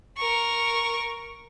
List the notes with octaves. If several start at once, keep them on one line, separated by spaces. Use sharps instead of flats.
A#4 C#6